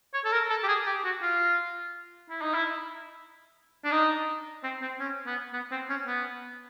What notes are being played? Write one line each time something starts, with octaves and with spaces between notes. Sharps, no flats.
C#5
A4
A#4
A4
G4
G#4
G4
F#4
F4
E4
D#4
E4
D4
D#4
C4
C4
C#4
B3
B3
C4
C#4
B3